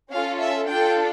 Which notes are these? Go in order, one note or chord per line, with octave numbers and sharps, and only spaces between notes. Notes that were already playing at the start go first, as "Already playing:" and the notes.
C#4 F4 A4 F5
E5
D4 F4 A4 G5